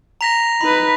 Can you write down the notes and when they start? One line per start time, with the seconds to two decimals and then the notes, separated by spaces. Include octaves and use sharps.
0.21 A#5 A#6 B6 F7
0.61 D#4 B4 B5